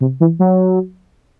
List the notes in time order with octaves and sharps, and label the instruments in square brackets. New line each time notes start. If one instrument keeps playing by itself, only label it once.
[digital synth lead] C3
E3
F#3